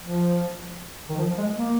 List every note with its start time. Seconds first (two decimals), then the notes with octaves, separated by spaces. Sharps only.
0.01 F3
1.09 D#3
1.18 F3
1.38 G#3
1.56 A#3